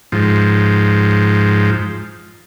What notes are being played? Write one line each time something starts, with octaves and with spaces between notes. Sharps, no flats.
G#2 F3